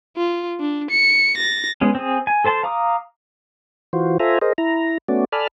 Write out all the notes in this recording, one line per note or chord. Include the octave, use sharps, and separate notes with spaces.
F4
D4
C#7
A6 A#6
G#3 B3 C#4
C4 G#4
G#5
A4 C5 A5 C6
F5 A#5 D6 D#6
E3 F4 F#4 C5
F4 A4 C5 E5 G#5 A#5
G#4 A#4 C5 D#5
E4 A#5
A3 B3 C#4 F#4 D5
A4 D5 G#5 A5 B5 F6